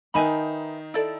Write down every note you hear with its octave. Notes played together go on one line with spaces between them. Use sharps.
D#3 D#4 B4 E5 G#5 B5
E4 A4 D5